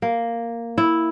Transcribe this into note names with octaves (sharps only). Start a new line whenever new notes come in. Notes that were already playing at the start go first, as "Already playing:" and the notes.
A#3
E4